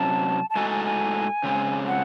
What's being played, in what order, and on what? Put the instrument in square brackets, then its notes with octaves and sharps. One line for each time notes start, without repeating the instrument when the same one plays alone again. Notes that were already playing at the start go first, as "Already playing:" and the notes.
Already playing: [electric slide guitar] C3 F#3 C#4 [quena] A5
[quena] A5
[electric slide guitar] A2 G#3 D#4 F#4 A4 [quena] G#5
[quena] G#5
G#5
[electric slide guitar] C#3 G#3 C4
[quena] F#5